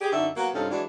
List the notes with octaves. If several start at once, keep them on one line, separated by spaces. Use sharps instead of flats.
G4 G#4
F#2 D3 D#4 F#4 A4 E5
F#3 A#3 B3 F#4
G2 C3 C#4 D#4 F4 A4
E3 F#3 G#3 D4